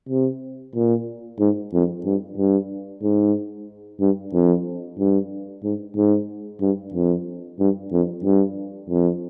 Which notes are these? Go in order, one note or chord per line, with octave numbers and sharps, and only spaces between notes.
C3
A#2
G#2
F2
G2
G2
G#2
G2
F2
G2
G#2
G#2
G2
F2
G2
F2
G2
F2